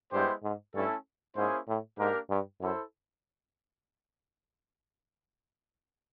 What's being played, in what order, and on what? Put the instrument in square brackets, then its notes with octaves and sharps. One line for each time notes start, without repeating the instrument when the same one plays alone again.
[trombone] G2 [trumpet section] G#3 B3 E4 G4 C5
[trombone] G#2
[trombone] G2 [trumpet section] A3 C#4 E4 A4
[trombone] G#2 [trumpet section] A#3 C#4 E4 G#4 C5
[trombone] A2
[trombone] G#2 [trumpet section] A#3 D4 G4 A#4
[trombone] G2
[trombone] F#2 [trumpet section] E4 A4 C5